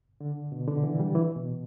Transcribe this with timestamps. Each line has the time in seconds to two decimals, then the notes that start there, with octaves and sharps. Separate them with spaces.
0.21 D3
0.52 B2
0.68 D3
0.84 E3
1.00 G3
1.15 E3
1.36 B2